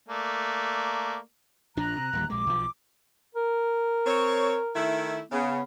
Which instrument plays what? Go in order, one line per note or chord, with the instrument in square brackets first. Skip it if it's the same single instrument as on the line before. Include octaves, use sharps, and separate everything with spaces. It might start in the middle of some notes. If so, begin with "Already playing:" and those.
[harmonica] A3 A#3 D5
[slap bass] A#1 F3 D4 [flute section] A#5 F#6
[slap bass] C3
D1 D#2 G3
[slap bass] A#1 G#3 [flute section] D6
[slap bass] B1 F3
[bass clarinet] A#4
[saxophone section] C4 C#5
D#3 A3 E4
[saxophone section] C#3 [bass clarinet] B3